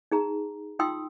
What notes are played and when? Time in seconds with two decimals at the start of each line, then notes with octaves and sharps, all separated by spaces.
0.12 D#4 G#4 A#5
0.79 D#4 F4 G5 C6 D#6 E6